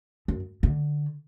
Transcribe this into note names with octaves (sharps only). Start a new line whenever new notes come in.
F#2
D3